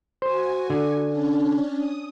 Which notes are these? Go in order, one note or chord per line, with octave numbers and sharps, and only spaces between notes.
F#4 C5 G#5
D3
C#4 D4
D#6